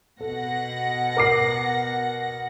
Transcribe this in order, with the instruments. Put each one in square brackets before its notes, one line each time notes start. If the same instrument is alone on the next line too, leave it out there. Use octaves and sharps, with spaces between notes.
[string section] B2 F#5 A#6 [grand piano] A4
[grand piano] A#4 D6 C7